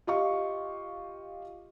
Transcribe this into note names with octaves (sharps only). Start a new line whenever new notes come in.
F4 G4 D#5 F5 C#6